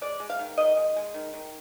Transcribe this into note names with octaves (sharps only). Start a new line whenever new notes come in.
G#3 D5
G#3
F5
D#3
D#3 D#5
G#3
G#3
D#3
D#3